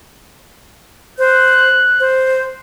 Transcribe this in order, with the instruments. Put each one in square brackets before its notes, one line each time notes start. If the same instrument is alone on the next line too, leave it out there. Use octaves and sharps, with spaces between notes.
[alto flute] C5 [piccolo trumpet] F#6
[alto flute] C5